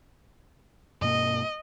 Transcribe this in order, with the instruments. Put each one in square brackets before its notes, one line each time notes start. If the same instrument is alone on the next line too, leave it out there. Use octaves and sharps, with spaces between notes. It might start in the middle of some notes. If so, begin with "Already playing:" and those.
[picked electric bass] G2 B2 A#3 [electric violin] D#5